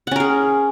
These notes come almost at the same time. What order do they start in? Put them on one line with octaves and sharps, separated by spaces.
F#5 C#4 A#4 G#4